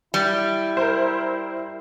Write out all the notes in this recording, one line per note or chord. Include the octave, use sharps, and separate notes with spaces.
G3 E4
A#4 C5